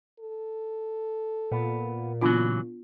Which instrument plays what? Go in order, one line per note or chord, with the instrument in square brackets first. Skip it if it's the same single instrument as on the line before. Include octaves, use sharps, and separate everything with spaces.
[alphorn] A4
[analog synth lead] A#2 [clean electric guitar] B3
[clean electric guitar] C#3 E3 F#3 [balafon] B3 D4 F4